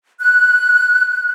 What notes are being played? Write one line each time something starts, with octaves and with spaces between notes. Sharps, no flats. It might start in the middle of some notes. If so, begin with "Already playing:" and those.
F#6